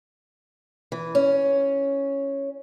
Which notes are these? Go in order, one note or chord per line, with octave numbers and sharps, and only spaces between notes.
E3
C#4